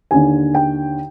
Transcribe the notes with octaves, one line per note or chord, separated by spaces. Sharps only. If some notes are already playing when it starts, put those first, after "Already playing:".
D#2 D3 G#5
G5